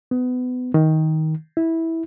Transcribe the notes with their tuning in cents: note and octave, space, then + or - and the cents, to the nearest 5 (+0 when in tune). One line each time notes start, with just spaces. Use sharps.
B3 +25
D#3 +15
E4 -15